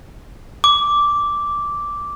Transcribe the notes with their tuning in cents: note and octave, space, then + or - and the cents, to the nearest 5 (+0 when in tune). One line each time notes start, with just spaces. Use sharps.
D6 -10